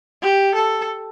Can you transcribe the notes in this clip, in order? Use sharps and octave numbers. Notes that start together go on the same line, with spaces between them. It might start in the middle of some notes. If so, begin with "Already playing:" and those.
G4
A4